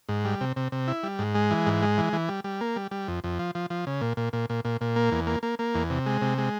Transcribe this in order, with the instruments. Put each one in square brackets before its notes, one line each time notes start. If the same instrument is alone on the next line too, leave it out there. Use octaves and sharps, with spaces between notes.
[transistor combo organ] G#2
G3
C3
C3
C3
E4
G3
G#2
G#3
E3
G#2
G#3
E3
E3
G3
G3
A#3
G3
G3
F2
F2
F3
F3
F3
C#3
A#2
A#2
A#2
A#2
A#2
A#2
A#3
E2
A#3
A#3
A#3
E2
C3
G#3
C3
G#3